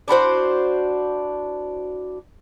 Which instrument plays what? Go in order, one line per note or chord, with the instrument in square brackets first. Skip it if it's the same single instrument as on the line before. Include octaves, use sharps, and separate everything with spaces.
[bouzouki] D4 E4 F#4 C5